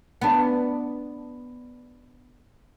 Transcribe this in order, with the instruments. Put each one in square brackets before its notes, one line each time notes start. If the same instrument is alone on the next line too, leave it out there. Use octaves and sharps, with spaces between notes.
[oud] B3 D4